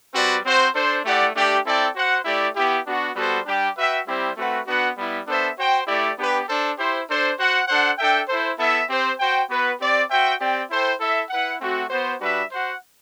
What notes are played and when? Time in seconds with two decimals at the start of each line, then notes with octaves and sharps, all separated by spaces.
0.14 G3 C4 F#4 B4 D5
0.44 C4 F#4 C5
0.74 D4 A4 C5
1.05 A3 E4 G4 D5 F#5
1.35 A3 D4 G4 D5
1.65 C4 E4 A4 D5 G5
1.95 F#4 C5 F#5
2.25 A3 E4 G4 D5
2.55 B3 E4 G4
2.85 B3 D4 F#4
3.15 G3 B3 F#4 A4 C5
3.46 G3 D4 G4
3.76 F#4 B4 E5 G5
4.06 G3 C4 E4 G4 C5
4.36 A3 C4 F#4 B4 F#5
4.67 B3 D4 F#4 B4 F#5
4.97 G3 B3 E4
5.27 B3 D4 A4 C5 E5
5.57 F#4 C5 G5
5.87 A3 E4 G4 D5
6.17 B3 D4 G4 B4
6.47 D4 A4 C5
6.78 E4 G4 C5
7.08 D4 A4 C5
7.38 F#4 C5 F#5
7.68 D4 A4 C5 F#5
7.98 D4 A4 E5 G5
8.28 E4 A4 C5
8.59 B3 E4 A4 E5
8.88 C4 G4 C5
9.19 F#4 C5 G5
9.49 B3 F#4 B4
9.79 C4 G4 D5
10.10 F#4 C5 E5 G5
10.39 C4 G4 D5 G5
10.69 E4 A4 C5 G5
11.00 E4 A4 E5
11.30 E4 B4 F#5
11.60 A3 C4 F#4
11.90 B3 F#4 C5
12.20 G3 D4 F#4 B4 E5
12.50 F#4 C5 F#5